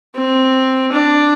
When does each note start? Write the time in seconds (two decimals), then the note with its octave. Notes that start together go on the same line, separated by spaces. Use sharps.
0.16 C4
0.93 D4